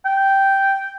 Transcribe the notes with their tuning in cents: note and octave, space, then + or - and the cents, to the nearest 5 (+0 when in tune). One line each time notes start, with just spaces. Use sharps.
G5 -5